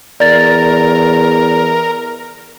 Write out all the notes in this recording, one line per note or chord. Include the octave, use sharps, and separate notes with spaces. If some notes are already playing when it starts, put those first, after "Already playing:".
E2 A#4 D5 A6